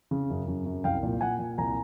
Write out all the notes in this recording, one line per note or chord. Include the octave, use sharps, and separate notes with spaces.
C#3
F#2
F#2
F#2
C2 F5 G5
A#2
A#2 F#5 G#5
A#2
C2 G#5 A#5